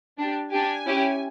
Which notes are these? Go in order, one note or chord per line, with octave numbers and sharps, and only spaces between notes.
D4 G4
D4 G4 G#5
C#4 E4 G4